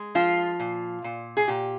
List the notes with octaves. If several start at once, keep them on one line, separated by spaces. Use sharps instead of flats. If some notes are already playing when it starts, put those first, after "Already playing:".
Already playing: G#3
F3 F4
A#2
A#2
G#4
A#2 G4